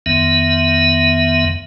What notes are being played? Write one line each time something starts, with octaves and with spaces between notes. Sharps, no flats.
F2 D#3 B3 E5